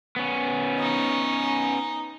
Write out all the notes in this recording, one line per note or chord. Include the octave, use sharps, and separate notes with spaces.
B3 C#4
D#4